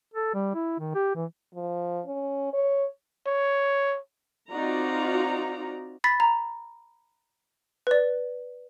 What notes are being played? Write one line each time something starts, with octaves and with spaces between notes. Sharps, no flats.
A4
G3
E4
D#3
G4
E3
F3
C#4
C#5
C#5
C4 D#4 F4 F#4 D5 A#5
B5 A6 B6
A#5
B4 D5